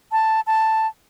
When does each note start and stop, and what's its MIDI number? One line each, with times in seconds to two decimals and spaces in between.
0.12 0.41 81
0.47 0.87 81